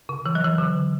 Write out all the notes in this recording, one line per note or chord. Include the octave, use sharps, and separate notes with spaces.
C#3
E3
F#3
E3
D3